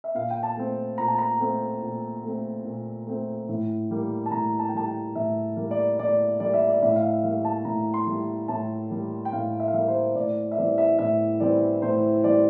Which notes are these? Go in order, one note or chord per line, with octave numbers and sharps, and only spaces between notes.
E5
A#2 F5
G5
A5
A3 C4
A#2 A#5
A5
A#5
A3 C4
A#2
A3 C4
A#2
A3 C4
A2
G3 A#3
A5
A2 A#5
A5
G5
G3 A#3 A5
G5
A2 E5
G3 A#3
D5
A2 D5
G3 A#3 D5
E5
D5
A2 E5
F5
E5
G3 A#3 F5
A5
A2 A#5
C6
G3 A#3
A2 A5
G3 A#3
G5
A2 F5
E5
F5
G3 A#3 E5
C5
A2 D5
E5
E3 G3 C4 D5
E5
A2 E5
E3 G3 C4 D5
A2 C5
E3 G3 C4 D5